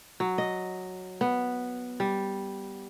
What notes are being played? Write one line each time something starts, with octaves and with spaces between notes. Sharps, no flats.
F#3
D#5
B3
G3